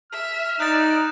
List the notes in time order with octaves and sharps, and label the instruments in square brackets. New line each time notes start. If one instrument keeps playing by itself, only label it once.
[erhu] E5 [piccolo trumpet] F6
[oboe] D#4 [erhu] D5 [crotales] F#6 A6 E7